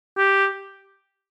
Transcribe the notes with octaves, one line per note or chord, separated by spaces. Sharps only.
G4